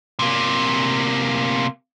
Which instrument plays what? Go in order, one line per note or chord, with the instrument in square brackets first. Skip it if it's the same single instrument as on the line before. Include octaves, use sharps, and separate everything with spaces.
[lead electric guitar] C3 A#3